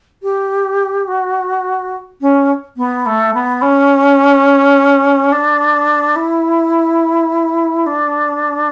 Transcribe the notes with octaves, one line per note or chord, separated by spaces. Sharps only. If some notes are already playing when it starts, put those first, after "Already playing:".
G4
F#4
C#4
B3
A3
B3
C#4
D4
E4
D4